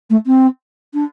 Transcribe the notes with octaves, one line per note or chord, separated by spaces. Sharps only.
A3
C4
D4